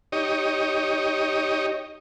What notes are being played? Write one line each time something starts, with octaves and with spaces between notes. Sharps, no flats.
D#4 G4 C#5 D#5